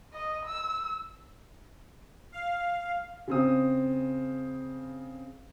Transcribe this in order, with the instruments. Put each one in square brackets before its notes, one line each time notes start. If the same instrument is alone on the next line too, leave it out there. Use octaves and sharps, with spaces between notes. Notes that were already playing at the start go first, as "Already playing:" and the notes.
[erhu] D#5
E6
[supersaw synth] F5
[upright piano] C#3 C4 D#6